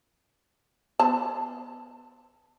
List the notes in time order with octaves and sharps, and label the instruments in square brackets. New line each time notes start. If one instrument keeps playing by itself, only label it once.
[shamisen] B3 C5 A5